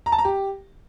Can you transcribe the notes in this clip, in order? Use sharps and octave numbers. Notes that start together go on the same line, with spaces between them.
A#5
A5
A#5
G4